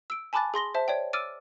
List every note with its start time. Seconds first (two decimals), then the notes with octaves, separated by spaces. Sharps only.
0.10 E6 D7
0.33 G#5 A5 B5 D6 F#6 A6
0.54 G#4 C6 A#6 G7
0.74 C5 E5 A5
0.88 C#5 D5 G5
1.13 D6 E6 F6 A6 D7 D#7